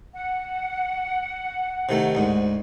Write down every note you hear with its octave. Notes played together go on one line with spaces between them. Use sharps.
F#5
C3 D#3 A3
D2 G#2